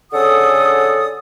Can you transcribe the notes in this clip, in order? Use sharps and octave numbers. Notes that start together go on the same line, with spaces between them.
D3 C#4 G#4 A4 F#5 D#6